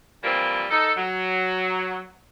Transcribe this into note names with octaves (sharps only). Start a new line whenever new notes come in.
E3 F3 G3 A#3 C4
D#4 A4
F#3